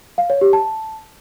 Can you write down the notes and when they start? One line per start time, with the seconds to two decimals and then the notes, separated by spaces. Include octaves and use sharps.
0.18 F5
0.30 C#5
0.41 G4
0.53 A5